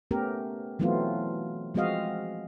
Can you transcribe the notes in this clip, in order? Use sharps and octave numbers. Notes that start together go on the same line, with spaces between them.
A3 B3 C#4 G4 A#4
E3 F#3 A3 B3 C4 F4
F3 G#3 C4 F#4 D#5 F5